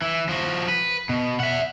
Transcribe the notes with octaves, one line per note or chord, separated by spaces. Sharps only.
E3
F3 F#4
B4
B2
E5 F#5